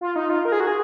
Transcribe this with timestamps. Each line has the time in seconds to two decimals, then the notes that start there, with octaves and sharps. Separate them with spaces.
0.01 F4
0.16 D#4
0.30 F4
0.45 A#4
0.52 G#4
0.60 F#4
0.67 G#4